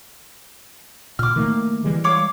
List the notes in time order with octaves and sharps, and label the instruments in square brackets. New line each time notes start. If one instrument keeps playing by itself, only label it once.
[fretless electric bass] A#2 [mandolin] D6 F6
[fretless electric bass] D#3 A3 A#3
E3 G3 G#3
[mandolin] C#5 F5 D6